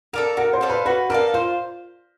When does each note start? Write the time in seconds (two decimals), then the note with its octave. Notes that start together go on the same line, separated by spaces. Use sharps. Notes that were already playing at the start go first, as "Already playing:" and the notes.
0.13 A4 A#4 D5 F5
0.37 F#4 A#4
0.53 C5
0.61 A4 D5 F5
0.70 B4
0.86 F#4 B4
1.10 A4 A#4 D5 F5
1.34 F4 C5